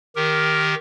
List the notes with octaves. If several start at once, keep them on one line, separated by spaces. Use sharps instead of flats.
D#3 G4 A#4